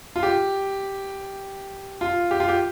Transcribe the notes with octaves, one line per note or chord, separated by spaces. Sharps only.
F4
G4
F4
G4
F4
G4